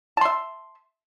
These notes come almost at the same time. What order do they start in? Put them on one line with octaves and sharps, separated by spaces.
A5 C6 E5